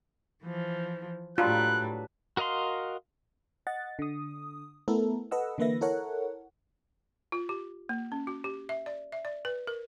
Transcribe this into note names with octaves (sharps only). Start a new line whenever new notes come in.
E3 F3
A2 F#3 G3 D4 F4 B4 F#6
F#4 A#4 D#5 F5 C6
D#5 F#5 A6
D3 D#6
A3 B3 E4 A4 A#4
A4 B4 D#5 F#5 E6
D3 E3 A#3 B4 E5 A#6
E4 A4 A#4 C#5 F#5
F4
G4
A#3
C#4
F#4
G4
E5
D5
E5
D5
B4
A#4